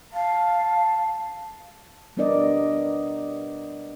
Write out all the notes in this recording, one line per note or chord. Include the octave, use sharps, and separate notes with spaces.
F5 A5
G3 B3 D4 A#4 D5 D#5